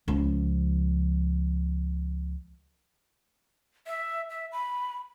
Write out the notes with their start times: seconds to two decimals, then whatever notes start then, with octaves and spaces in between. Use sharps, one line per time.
0.08 C#2 F3
3.87 E5
4.30 E5
4.52 B5